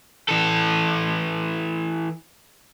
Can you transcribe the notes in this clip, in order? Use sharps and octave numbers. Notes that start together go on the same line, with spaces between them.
E3 A4